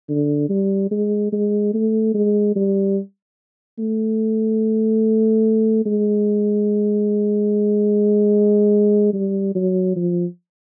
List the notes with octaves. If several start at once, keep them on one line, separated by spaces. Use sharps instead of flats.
D3
G3
G#3
G#3
A3
G#3
G3
A3
G#3
G3
F#3
F3